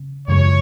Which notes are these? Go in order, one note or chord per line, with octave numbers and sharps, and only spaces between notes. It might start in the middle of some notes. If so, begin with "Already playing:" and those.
Already playing: C#3
F#2 C#3 F3 G#3 C#5